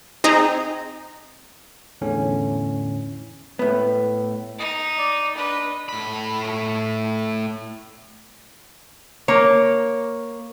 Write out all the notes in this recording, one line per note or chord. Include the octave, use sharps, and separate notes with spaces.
C4 D#4 G#4 D#5 A#5
E2 A2 D3 C#4
A2 B3
D#4 D#5
D5
D4 B4 D#5
A2 B5
A#3 C#5